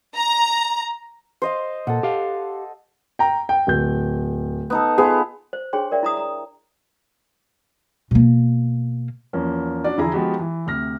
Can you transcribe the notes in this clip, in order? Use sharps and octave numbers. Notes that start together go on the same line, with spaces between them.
A#5
C5 D#5 F5
A#2 A4 F#5
G4 F5
G5 A#5
G5
D1 G6
B3 D#4 A4
B3 F4 G#4
C5
D4 G4 G#4 C#5 G5 C6
A#4 D5 E5 G5
E4 A#5 D#6
A#5
B2 A#3
E2 F3 A#3 C#4
C#4 D4 F#4 D5
E2 D3 F3 E4 G#4 A#5
F3 G#3 B3 D#4 F#4 G4
E3
D2 C3 F6 A#6